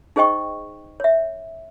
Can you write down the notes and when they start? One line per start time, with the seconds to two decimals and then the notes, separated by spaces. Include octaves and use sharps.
0.16 D#4 G#4 C5 D#5 G5 C#6
1.00 C#5 E5